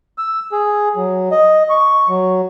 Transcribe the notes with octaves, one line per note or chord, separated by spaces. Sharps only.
E6
G#4
F#3
D#5
C#6
F#3